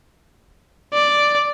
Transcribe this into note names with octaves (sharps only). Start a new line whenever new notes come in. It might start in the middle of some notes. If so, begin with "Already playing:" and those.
D5